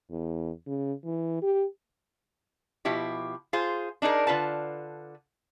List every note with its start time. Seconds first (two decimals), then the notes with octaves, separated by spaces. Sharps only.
0.11 E2
0.66 C#3
1.04 E3
1.42 G4
2.85 B2 F3 E4 G4
3.53 F4 G#4 C5
4.02 D4 D#4 G#4 A#4
4.27 D3 F4 B4 A5